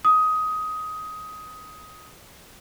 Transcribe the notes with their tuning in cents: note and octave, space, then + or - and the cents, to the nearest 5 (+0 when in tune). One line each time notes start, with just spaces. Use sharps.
D#6 +15